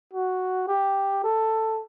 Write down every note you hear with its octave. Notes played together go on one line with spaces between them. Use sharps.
F#4
G4
A4